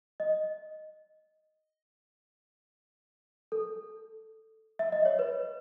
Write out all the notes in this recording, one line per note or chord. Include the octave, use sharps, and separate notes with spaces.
D#5
A4
E5
D#5
C#5
B4